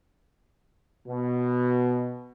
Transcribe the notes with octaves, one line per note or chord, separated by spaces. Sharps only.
B2